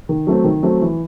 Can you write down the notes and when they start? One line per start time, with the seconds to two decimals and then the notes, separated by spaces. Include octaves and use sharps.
0.09 D#3
0.27 F#3 A3 C4
0.44 D#3
0.63 F#3 A3 C4
0.81 E3